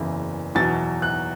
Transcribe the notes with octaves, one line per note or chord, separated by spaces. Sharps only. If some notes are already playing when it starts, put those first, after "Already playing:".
Already playing: F#1 E2 C#3 E3
E2 B2 F#3 A6
F#6